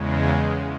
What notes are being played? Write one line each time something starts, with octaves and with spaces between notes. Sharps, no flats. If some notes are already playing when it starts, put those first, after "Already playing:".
Already playing: E2 C#3 G#3